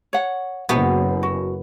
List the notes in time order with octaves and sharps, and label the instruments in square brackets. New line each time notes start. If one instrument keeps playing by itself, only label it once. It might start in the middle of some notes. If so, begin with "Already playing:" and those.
[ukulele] C#5 F#5
[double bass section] F#1 [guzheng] B3 [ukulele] F#4 C5 A#5
[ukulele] F#4